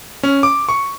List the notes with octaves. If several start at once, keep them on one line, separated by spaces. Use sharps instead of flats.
C#4
D6
C#6